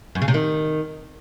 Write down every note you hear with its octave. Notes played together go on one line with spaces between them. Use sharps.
F#2
C#3
C3
D#3